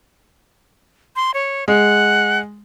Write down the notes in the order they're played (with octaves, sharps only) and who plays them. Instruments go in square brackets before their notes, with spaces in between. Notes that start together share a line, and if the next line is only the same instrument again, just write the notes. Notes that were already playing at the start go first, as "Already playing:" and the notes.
[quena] C6
C#5
[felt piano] G#3 [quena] F#5